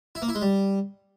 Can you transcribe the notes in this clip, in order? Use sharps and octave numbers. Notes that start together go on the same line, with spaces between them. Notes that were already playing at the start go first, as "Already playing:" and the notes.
E4
A#3
E4
G#3
G3